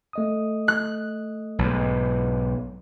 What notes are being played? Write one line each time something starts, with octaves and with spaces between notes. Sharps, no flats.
A3 D#5 D#6
F#6
B1 G#2